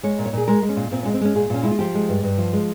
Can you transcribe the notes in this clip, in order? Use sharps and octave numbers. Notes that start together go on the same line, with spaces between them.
G#3 C#5
A#2
C#5
A#2 G#4
G#3 A#4
G#3
C#4
A#2
A#2 C4
C#4
G#3
C4
G#3 C#4
A#2 G#4
A#2 C#4
G#3 E4
F4
F3 G4
G#3
G2
G2
F3
G#3